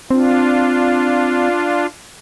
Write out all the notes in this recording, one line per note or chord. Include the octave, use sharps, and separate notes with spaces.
C4 D4 F4